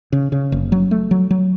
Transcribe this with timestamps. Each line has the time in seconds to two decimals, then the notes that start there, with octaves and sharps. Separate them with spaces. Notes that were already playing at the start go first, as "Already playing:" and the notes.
0.13 C#3
0.32 C#3
0.52 F#1
0.72 F#3
0.91 A3
1.11 F#3
1.31 F#3